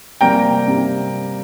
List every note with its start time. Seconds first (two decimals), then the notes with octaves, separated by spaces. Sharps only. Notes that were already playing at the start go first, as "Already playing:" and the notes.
0.21 C3 G3 A#3 G5 A#5
0.68 C3